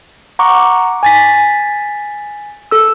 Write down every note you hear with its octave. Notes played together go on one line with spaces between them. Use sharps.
F#5 A#5 C#6 D6
G#5 A6 B6
A4 E6